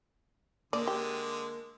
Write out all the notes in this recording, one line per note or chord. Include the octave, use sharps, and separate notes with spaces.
D3 G#3 A#3 D5
G4